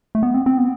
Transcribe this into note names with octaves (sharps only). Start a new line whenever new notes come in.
A3
B3
C4
C4
B3